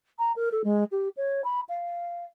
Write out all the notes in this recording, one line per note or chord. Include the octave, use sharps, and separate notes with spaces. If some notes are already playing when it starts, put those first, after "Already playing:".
A#5
A#4
A4
G#3
G4
C#5
B5
F5